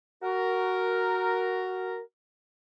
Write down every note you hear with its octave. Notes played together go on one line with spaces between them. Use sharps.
F#4 A#4